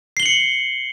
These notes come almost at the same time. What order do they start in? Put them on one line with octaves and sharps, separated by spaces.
C7 G7 F#7 C#7